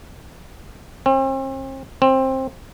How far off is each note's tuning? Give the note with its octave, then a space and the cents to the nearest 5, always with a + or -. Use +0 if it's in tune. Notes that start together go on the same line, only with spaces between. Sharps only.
C4 +40
C4 +15